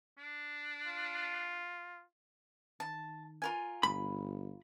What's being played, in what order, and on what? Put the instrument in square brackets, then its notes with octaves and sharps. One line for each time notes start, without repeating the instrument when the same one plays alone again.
[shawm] D4
[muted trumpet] F4
[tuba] D#3 [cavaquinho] A5
[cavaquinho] F4 A#4 G#5
[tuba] G1 [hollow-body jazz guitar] B5